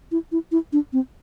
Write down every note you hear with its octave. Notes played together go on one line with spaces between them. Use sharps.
E4
E4
E4
D4
C4